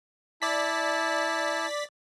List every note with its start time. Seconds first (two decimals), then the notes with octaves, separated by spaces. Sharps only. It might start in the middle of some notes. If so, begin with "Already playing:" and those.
0.42 E4 D5 A5 B6